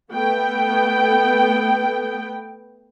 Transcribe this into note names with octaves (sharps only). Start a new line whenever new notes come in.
A3 B3 G5